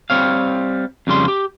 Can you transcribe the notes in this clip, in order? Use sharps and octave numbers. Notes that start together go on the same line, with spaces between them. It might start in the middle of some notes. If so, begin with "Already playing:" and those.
G3 C4 C#5 F5
F2 C#3 G3 C6
G4